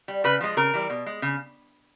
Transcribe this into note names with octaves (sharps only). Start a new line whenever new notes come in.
G3
C#3 B4
F3 G#3
C#3 A#4
E3 G3
B2
G#3
C#3